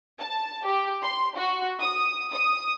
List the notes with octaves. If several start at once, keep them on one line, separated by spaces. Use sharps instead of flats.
A5
G4
C6
F#4
D#6
D#6